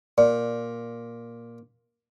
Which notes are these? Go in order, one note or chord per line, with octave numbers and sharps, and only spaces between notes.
A#2 D5